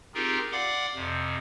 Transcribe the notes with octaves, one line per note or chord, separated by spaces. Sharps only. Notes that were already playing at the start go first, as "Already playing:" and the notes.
C4 D#4 F4 G4 G#4 A#4
D5 F5 F#5 C6 D6
F2 C3